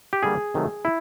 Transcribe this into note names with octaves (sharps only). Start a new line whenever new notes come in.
G4
D3 G3 A#3 G#4
C3 D#3 F#3 A3
E4